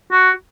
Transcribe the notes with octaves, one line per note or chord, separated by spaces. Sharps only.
F#4